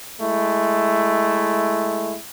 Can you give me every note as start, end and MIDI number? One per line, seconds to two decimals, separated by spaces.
0.20 2.14 56
0.20 2.14 57
0.20 2.14 64